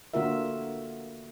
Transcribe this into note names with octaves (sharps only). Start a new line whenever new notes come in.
D3 A#3 F4 F#4 A#4 E5